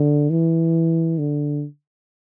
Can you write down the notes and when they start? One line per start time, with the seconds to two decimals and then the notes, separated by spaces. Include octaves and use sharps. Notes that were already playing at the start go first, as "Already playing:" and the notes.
Already playing: D3
0.30 E3
1.18 D3